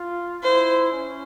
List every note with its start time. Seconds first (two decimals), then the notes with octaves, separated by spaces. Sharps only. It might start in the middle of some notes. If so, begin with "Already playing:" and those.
Already playing: F4
0.43 E4 C5
0.92 C#4